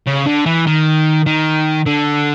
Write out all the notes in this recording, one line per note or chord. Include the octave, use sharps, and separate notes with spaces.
C#3
D3
E3
D#3
D#3
D3